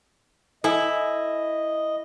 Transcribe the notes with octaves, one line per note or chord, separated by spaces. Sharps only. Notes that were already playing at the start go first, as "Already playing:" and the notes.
E4 A4 D#5 G#5